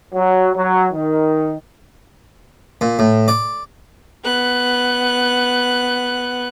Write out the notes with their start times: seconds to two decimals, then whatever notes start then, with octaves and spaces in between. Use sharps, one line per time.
0.14 F#3
0.55 F#3
0.93 D#3
2.81 A#2
2.99 A2
3.28 D5
4.24 B3 F#6